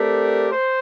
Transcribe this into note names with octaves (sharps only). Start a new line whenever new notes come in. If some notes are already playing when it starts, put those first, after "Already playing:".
Already playing: A3 C4 G4 A#4 D5
C5